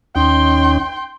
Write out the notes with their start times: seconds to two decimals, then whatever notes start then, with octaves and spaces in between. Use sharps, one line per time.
0.16 D#2 C#4 D#4 G5 C6